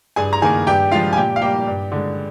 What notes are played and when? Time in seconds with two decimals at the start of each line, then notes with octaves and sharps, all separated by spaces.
0.16 G2 G#4 G#5
0.33 A#5
0.42 D#3 A#3 G#4 G#5
0.67 G2 G4 G5
0.92 F3 G#3 F4 F5
1.13 G#5
1.17 A#2 G4 G5
1.36 F5
1.42 G3 A#3 G4 G5
1.67 G2
1.92 D3 G#3